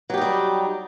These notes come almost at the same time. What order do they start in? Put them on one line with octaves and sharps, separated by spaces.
F#3 G4 D#4 G3